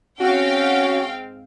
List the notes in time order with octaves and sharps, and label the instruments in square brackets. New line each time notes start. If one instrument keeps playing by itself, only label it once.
[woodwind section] G#2 C4 [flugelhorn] C#4 [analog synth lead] F#4 [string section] F5 G5